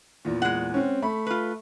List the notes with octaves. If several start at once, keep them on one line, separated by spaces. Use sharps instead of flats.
E2 A#2
G#3 F#5
C4 C#4
A3 B5
F4 B4